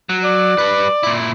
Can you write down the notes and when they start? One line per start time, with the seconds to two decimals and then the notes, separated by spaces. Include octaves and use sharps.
0.09 F#3
0.24 D5
0.58 G3 B4
1.03 A#2 E4